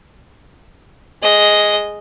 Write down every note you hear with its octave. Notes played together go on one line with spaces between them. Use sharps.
G#3 D#5